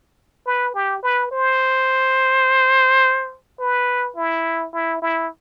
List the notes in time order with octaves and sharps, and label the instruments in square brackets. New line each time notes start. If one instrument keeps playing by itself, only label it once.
[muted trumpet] B4
G4
B4
C5
B4
E4
E4
E4